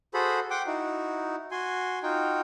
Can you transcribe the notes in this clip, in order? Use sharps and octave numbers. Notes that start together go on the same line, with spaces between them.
F#4 G#4 A4 C5 B5
F#5 G5 C6 D6
D#4 E4 F#4
F#4 G#5 C6
D#4 F4 F#4 G5